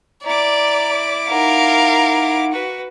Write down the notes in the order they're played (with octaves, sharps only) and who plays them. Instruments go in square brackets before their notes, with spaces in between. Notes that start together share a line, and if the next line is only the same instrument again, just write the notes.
[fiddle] E4 D6 [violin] D5 [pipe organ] A#5
[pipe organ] D#4 F#5 [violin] A#4 F5
[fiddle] F#4 B4